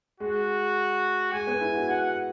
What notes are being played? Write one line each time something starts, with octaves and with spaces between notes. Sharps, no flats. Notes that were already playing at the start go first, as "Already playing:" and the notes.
G#3 F#4
G#3 G#5
B3
E4
F#4
F#4 F#5